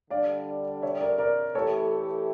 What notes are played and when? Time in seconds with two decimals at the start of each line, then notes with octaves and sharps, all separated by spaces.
0.10 D3 G3 D4 D5 F5
0.82 C#5 E5
1.01 A#4 D5
1.18 A#4 D5
1.55 E3 A3 E4 G4 A4 C#5